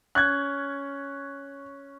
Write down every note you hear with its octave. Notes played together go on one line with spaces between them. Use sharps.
C#4 F#6 G#6